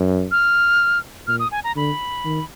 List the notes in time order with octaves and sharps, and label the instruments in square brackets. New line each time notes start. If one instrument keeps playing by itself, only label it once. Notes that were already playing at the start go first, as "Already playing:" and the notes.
Already playing: [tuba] F#2
[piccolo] F6
[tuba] A#2 [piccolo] F6
[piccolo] D#6
G#5
A#5
[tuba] D3 [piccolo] B5
[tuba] D#3